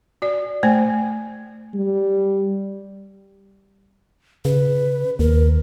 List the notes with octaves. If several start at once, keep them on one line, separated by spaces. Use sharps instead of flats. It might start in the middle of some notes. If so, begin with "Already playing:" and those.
F#4 D5
A3 C5 G#5
G3
C#3 B4
D#2 A#4